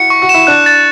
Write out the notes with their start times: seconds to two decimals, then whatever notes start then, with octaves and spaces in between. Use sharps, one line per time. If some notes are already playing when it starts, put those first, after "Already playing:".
Already playing: E4 F#4 C#7
0.10 C#6
0.22 F#4
0.29 E7
0.34 E4
0.47 D4 F#6
0.66 A6